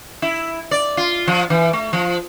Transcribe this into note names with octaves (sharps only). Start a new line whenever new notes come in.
E4
D5
F4
F3
E3
A3
F3